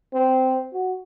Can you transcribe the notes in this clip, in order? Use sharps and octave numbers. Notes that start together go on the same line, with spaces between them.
C4
F#4